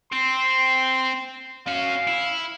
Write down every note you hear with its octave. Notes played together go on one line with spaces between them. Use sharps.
C4 C6
C#4 F#4 F5
E4